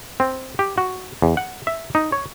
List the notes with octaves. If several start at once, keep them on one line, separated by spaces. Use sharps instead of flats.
C4
G4
F#4
E2
F#5
E5
D#4
C#5